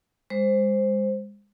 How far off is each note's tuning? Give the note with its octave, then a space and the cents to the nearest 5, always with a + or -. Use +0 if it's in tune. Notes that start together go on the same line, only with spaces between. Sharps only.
G#3 -30 C5 +0